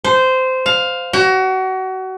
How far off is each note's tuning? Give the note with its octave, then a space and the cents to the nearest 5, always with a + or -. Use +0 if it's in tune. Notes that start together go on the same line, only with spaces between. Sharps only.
C5 -15
F5 +10
F#4 +30